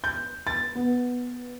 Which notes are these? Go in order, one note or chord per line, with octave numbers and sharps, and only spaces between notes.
G6
A6
B3